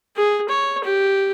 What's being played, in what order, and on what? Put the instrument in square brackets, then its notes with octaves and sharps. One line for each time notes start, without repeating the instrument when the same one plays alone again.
[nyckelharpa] G#4
C#5
G4